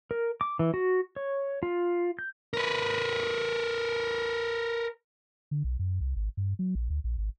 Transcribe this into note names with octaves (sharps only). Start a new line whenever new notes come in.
A#4
D6
E3
F#4
C#5
F4
G6
A#4 B4
D3
B1
F#2
C2
G#1
G2
F#3
A#1
D2
A#1
G#1